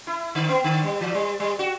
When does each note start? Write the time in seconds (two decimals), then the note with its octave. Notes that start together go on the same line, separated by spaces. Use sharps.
0.07 E4
0.35 D3
0.49 B3
0.64 D3
0.84 G3
1.01 E3
1.15 G3
1.40 G3
1.59 F#4